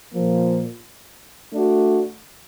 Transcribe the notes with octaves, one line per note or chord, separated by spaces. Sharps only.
A#2 F3 A#3
A3 D4 F#4